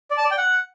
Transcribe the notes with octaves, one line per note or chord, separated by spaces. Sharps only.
D5
A5
D5
G5
F#5